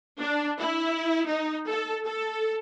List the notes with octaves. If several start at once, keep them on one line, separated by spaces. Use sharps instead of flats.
D4
E4
D#4
A4
A4